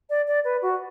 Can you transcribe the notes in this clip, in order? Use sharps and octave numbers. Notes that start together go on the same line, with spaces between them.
D5
D5
B4
F#4